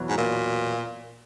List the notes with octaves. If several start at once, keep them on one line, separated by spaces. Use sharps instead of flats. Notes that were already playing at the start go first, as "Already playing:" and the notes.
Already playing: E2 B2 F#3
G#2
A#2